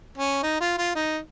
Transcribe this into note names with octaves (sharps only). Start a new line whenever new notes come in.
C#4
D#4
F4
F4
D#4